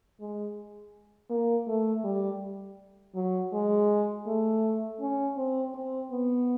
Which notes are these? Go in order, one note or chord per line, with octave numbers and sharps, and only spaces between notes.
G#3
A#3
A3
G3
F#3
G#3
A3
C#4
C4
C4
B3